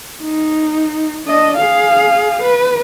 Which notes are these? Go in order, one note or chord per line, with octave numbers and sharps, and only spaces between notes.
D#4
D4 D#5
G#4 F5
B4